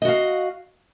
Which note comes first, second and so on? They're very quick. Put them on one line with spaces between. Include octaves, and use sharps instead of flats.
D#5 F#4 F5